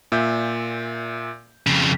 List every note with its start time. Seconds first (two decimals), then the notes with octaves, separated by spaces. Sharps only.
0.12 A#2 E5 G6
1.67 F2 C#3